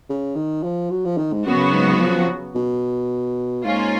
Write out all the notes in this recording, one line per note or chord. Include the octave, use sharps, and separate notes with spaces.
C#3
D#3
F3
F#3
F3
D#3
G#2
F#2 C#3 F#3 B3 F#4
G#2
F3
B2
G#2 A#3 C#4 F4